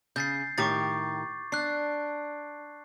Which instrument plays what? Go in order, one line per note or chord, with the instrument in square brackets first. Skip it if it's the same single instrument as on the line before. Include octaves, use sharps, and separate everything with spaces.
[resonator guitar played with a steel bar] C#3 [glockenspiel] G6 A6 C7
[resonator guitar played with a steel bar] A2 D#3 G4 [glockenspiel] C#6 D6 A6
[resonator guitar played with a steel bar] D4 [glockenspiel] F#6 C7